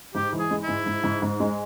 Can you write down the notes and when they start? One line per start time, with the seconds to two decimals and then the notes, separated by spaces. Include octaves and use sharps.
0.15 G#2 G4
0.33 E3
0.39 G#4
0.51 G#3
0.62 E4
0.68 G#2
0.86 G#2
1.04 G#2
1.22 G#2
1.40 G#3